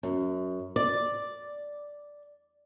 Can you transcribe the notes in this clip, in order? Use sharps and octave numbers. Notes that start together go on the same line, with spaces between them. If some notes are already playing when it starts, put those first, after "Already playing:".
F#2
D5